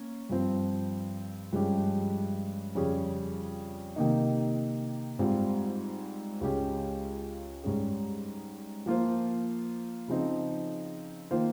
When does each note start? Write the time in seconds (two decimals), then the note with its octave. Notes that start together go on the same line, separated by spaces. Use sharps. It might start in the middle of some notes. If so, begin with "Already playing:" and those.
Already playing: A#3 C#4
0.29 G2 F3 C4
1.52 G2 F3 G#3 C#4 G4
2.75 F2 C#3 G3 C#4 G#4
3.96 C3 D#3 A#3 D#4
5.19 G#2 G3 C4 F4
6.41 C#2 C#3 G#3 C#4 G4
7.63 G#2 G3 C#4 G#4
8.86 F3 A#3 F4 C5
10.08 C#3 F3 C4 D#4
11.31 D#3 A#3 F4 C5